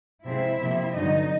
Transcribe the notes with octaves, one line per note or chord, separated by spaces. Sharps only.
C3 F3 G#3 C4 E4 E5
C3 F3 A#3
G2 D3 F#3 B3 D#4 D#5